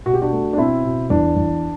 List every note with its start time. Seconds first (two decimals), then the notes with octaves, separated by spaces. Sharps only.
0.06 B2 F#4
0.14 G4
0.22 D4 F#4
0.32 A3
0.53 D4
0.58 B2 C4 E4
0.84 B2
1.10 E2 D4
1.36 E2